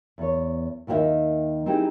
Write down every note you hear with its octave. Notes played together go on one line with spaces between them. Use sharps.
E2 C#5
D#2 D#3 F#4 G4 D#5 E5
C4 D#4 E4 G4 G#4